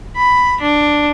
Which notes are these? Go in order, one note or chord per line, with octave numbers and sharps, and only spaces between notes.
B5
D4